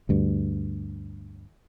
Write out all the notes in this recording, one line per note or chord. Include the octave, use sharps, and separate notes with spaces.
D2 G2